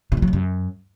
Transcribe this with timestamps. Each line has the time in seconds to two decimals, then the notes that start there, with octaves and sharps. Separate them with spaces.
0.12 C#3
0.17 D#3
0.22 F#3
0.28 D3
0.33 F#2